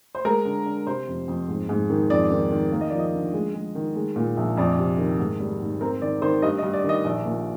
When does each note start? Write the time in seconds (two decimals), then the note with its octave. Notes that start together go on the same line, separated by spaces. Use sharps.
0.15 C5
0.25 G#3 A#4
0.45 D3
0.66 D3
0.87 C3 C5
1.08 F2
1.28 F2
1.49 G#2
1.69 G#2
1.90 D#3
2.10 F2 D5
2.31 D#3
2.52 D#3
2.72 A#3
2.81 D#5
2.90 F3 D5
2.99 D#5
3.14 D3
3.34 G#3
3.54 G#3
3.75 D#3
3.96 G#3
4.16 A#2
4.37 A#1
4.57 F2 D5
4.78 C3
4.98 D#3
5.19 G#2
5.40 G3
5.60 G#2
5.81 C4 A#4
6.02 D#3 D5
6.22 D#3 C5
6.42 G2 D#5
6.58 D#5
6.63 G2
6.73 D5
6.84 D#3 D#5
7.04 A#1 D5
7.25 A#2